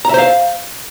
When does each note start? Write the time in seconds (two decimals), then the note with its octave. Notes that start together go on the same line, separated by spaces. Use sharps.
0.05 A#5
0.09 E5
0.14 C5
0.18 F5